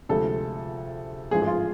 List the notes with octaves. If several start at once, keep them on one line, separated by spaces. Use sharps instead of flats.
D2 C3 F3 G#3 A4
A1 G#2 F3 G#3 G#4
G#4
F4